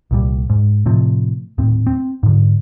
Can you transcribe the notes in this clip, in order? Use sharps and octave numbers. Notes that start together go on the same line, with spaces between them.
C2 A#2 G3
G#2
A2 C3 F3
D#1 A2 C4
C4
G#2 D3